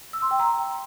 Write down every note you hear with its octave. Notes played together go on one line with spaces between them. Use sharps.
E6
C6
G5
A#5